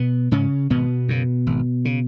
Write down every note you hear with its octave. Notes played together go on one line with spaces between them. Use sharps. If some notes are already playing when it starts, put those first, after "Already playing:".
Already playing: B2 B3
G#2 C#3 C#4
G#1 B2 B3
F#2 C#3
G#1
C#3